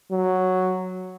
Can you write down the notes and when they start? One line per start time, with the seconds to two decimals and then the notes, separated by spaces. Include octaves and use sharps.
0.11 F#3